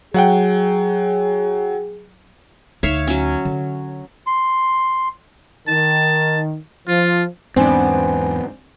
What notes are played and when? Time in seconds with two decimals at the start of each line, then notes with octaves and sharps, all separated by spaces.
0.14 F#3 G#4 F#5 G5
2.83 D2 D#4 C#5 E5 F5
3.07 F#3 C#4
3.45 D3
4.27 C6
5.68 D#3 A5
6.88 F3 F4
7.56 E2 G#2 B3 C4 D4 C5 G#5